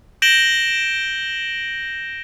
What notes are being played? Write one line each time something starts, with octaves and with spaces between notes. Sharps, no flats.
G6 A#6 D7 E7 F#7 G7